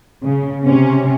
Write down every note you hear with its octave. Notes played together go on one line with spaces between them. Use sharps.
C#3
C3 C#4